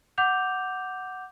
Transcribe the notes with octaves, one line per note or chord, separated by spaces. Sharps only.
F#5 D6 G6 F7